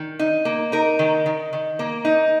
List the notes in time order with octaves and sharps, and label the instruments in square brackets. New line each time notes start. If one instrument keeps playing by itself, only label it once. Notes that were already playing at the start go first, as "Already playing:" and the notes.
Already playing: [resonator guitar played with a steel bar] D#3
D#4
A#3
D#4 A#4
D#3
D#3
D#3
A#3
D#4